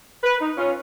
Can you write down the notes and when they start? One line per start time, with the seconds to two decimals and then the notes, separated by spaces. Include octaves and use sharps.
0.24 B4
0.41 D#4
0.57 C#4 F4